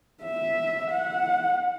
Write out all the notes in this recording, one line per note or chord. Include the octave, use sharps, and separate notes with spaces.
E5
F#5